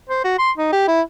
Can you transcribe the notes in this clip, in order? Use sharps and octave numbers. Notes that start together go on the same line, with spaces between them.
C5
F#4
C6
D#4
G4
E4